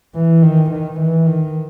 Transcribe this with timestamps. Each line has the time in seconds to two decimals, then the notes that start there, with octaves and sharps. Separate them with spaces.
0.15 E3
0.43 D#3
0.71 D#3
1.00 E3
1.27 D#3